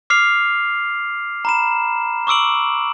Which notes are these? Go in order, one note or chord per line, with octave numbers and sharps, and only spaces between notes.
D6 F6 C7 F7
A#5 B5 E7
C#6 D6 E6 D7 F#7